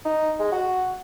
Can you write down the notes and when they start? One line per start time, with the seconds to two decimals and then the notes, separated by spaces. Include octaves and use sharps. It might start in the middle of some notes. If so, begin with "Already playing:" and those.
0.05 D#4
0.39 G#3
0.52 F#4